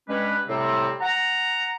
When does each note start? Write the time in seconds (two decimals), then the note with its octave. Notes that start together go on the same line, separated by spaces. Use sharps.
0.08 G2 G#3 C#4 G4 B4
0.48 A2 C3 G3 C4
1.01 F#5 A#5